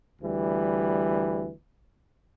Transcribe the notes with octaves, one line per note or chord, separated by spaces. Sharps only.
D2 E3 G3